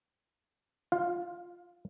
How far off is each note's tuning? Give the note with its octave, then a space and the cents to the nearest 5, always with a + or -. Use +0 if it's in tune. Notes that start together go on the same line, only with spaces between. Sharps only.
F4 +0 F5 +25